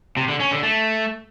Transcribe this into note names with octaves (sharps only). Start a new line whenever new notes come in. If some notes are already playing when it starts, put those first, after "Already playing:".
C3
D3
C#4
D3
A3